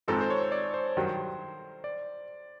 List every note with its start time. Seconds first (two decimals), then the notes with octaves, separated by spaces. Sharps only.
0.08 G#1 G#2 F3 G#3 C4 A4
0.21 C5
0.30 C#5
0.52 D5
0.74 C5
0.97 G2 D#3 F#3
1.84 D5